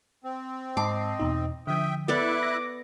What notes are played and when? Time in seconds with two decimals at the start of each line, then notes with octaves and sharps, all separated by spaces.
0.24 C4
0.77 G#2 D#5 A5 D6 C7
1.20 E2 B2 D#4
1.67 D3 F3 E5 G5 D#6
2.08 B3 E4 A4 D5 E5 D6 F#6
2.43 A#6